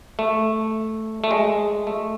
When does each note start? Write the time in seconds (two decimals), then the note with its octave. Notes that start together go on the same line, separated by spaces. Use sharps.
0.19 A3
1.24 A3
1.31 G#3
1.87 A3